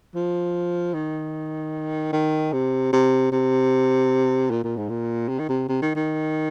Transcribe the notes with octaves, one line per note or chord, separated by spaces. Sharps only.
F3
D#3
D#3
C3
C3
C3
A#2
A#2
G#2
A#2
C3
D#3
C3
C3
D#3
D#3